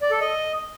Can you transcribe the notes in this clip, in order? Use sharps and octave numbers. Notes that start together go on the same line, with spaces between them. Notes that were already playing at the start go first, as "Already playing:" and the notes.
D5
A4
D#5